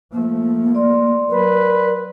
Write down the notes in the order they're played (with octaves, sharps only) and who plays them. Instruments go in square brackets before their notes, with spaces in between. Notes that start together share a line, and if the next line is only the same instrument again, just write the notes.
[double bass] F3 A3 [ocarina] A#3
[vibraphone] D5 C6
[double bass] F#3 [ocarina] A#4 [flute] B4